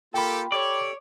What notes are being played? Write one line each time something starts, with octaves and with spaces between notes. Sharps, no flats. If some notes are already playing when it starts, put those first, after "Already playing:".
A#3 F4 G4 A4 G5 B5
G4 A4 C#5 D5